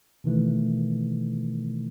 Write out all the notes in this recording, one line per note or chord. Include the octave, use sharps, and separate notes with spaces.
B2 D#3 E3 A3